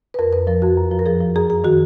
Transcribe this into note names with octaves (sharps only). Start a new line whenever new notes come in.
B4
F2 A#4
F2 B4
F3 A#4
F2 F#4
F#2
F3
A#4
F3 G#4
F3
F#2 G#4
F#2 G#4
D#3 F#4